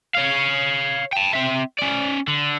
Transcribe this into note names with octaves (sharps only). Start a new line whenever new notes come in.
C#5 F5
G5 A5
C4 E5
C#4 D5
D3